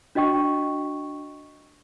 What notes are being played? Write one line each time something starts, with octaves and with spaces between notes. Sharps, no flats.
D4 F#4 D#5 G5 C#6